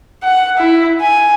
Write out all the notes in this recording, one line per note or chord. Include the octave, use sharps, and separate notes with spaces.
F#5
E4
G#5